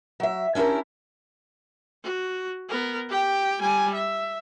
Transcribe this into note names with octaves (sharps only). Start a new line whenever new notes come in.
F#3 E5
C#4 D4 E4 G4 A#4
F#4
B3 A#4
G4 G5
G3 G#5
E5